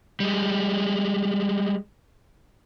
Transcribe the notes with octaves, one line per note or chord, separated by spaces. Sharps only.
G3 G#3